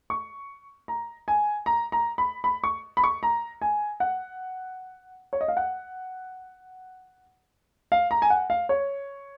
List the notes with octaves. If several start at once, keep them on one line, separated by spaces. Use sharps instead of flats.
C#6
A#5
G#5
A#5
A#5
B5
B5
C#6
B5
C#6
A#5
G#5
F#5
C#5
D#5
F5
F#5
F5
A#5
G#5
F#5
F5
C#5